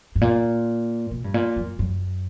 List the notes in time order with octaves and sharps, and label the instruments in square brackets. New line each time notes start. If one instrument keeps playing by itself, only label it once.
[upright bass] G2
A#2
B2
G2
A#2
F#2
F#2